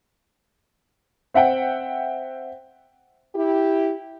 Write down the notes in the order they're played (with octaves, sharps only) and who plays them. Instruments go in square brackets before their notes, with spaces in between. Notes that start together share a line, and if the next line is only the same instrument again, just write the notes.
[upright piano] C4 E5 F#5 G5
[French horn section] E4 G4